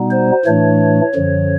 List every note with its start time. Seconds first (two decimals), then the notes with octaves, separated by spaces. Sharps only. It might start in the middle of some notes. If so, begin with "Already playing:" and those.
Already playing: B2 G3 B3 D#4
0.10 C5
0.45 A2 E3 A3 D4 C#5
1.15 F#2 D3 F3